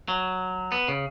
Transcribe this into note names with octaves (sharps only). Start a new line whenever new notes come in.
F#3
B3
C#3